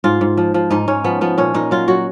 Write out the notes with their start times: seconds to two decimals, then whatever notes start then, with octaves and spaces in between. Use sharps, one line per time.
0.04 G#2 F4
0.21 G#2
0.37 F3
0.54 F3
0.71 G#2 D#4
0.88 G#2 C#4
1.04 F3 B3
1.21 F3 B3
1.38 A#2 C#4
1.54 A#2 D#4
1.71 F#3 F4
1.88 F#3 F#4